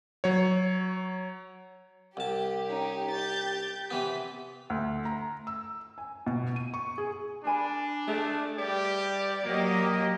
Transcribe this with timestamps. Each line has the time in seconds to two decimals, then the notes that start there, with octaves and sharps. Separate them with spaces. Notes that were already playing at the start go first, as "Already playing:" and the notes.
0.24 F#3 C#5
2.17 C2 G4 A5
2.67 C#4 D#4
3.11 G6 A6
3.91 C3 E3 B3 B6
4.70 D2
5.05 A#5
5.47 E6
5.98 G#5
6.27 B2
6.56 D#7
6.74 C#6
6.98 G#4
7.45 D4 A#4 G#5 B5
8.08 A3 G#4 E5
8.58 G3 G4 D5
9.43 F#3 A#3 G4 D#5